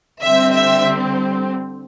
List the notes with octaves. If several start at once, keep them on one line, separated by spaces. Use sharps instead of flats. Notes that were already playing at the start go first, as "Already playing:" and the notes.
D3 G3 C4 E5
E5